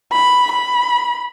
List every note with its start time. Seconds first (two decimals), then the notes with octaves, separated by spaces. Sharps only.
0.12 B5
0.52 B5